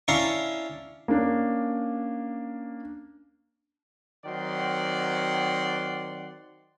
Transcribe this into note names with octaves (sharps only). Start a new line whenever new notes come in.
C#4 D4 E4 C#5 F5 A#5
A#3 C#4 D4
D#3 F#3 C4 D5 F#5 C6